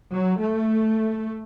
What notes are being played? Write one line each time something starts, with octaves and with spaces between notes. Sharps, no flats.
F#3
A3